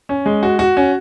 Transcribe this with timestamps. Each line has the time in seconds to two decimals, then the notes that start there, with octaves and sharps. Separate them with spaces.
0.09 C#4
0.26 G#3
0.43 F#4
0.59 F#4
0.77 C#4